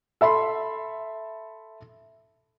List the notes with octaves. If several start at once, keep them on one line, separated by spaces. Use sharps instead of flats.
A4 E5 B5 C6